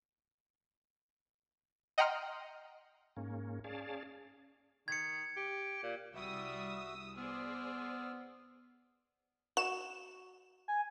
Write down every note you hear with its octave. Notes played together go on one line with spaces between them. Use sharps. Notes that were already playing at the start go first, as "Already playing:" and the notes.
D#5 F#5 G5 A#5 C6 F6
G#2 A#3 C#4
C#4 G#4 D5 F5 A5
D#3 G#6 C#7
G4
A#2
C2 G3 F#4 E5 D#6 E6
B3 G#4 C5 D5 E6 F6
F#4 E7
G#5